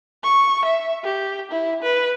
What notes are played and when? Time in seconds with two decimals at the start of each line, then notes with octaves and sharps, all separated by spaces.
0.23 C#6
0.65 E5
1.04 G4
1.51 E4
1.82 B4